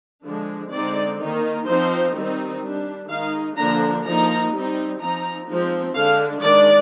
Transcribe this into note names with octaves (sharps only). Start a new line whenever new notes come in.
D3 F3 G#3 D4
D3 G#3 C4 D#4 D5
D#3 A#3 D#4
F3 C4 D#4 C5
D#3 G3 C4 D#4
G3 D4
D#3 G#3 D#4 F5
D3 F3 A#3 D4 A#5
F3 A#3 D#4 A#5
G3 C4 D#4
F3 C4 D#4 A#5
F3 G#3 C4 D#4
D3 G#3 D4 F5
D#3 G#3 D4 D5